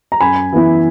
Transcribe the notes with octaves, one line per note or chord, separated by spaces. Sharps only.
A#5
F#2 G#5 B5
E3 B3 E4